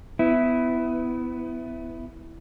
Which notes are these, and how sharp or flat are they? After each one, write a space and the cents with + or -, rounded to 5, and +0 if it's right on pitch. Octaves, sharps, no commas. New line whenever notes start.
B3 +20 E4 +0